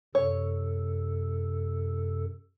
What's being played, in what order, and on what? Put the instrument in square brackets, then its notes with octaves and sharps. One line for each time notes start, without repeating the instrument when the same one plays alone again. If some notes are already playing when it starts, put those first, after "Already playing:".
[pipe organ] F#2 C3 A4 [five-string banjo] C#5